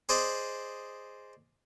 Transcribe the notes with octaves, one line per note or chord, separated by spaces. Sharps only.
G#4 C5 D5 D#5